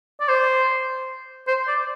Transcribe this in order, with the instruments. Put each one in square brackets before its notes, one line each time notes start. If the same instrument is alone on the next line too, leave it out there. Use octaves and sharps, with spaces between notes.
[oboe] D5
C5
C5
D5